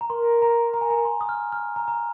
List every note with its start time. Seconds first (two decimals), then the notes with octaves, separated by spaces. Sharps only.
0.01 A#5
0.09 A#4 C6
0.42 A#5
0.74 A#5
0.81 G#5
0.90 A#5
1.05 C6
1.21 D#6
1.29 F6
1.52 F6
1.76 A#5
1.88 A#5